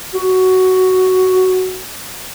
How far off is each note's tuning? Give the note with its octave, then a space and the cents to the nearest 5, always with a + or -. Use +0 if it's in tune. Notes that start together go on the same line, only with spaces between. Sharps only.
F#4 +10